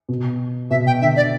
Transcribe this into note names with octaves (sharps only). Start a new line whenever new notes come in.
B2
B2 E5
G5
D3 E5
D5